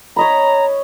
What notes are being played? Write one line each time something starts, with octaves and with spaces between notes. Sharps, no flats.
C#5 D#5 A#5 B5